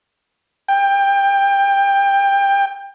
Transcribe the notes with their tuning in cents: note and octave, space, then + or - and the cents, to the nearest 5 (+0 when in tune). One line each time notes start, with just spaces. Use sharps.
G5 +20